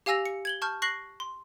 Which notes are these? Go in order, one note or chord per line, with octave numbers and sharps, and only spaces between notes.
G4 F5 G#5 E6 A#6 F7
C#7
G#6 F#7 G7
A5 C#6 F6 G6
C#6 F#6 A#6 C7 F#7
C6